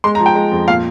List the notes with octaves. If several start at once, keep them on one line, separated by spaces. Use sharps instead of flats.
G#3 C6
A#5
F3
G5
G#3
F2
A#2 F5